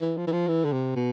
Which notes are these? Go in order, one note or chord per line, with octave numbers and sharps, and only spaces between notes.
E3
F3
E3
F3
E3
D3
C3
B2